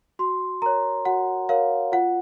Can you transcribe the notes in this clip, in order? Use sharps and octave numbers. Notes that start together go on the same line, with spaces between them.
F#4 C6
A#4 C#5 A#5
F#4 F#5
A#4 C#5 F5
F4 F#5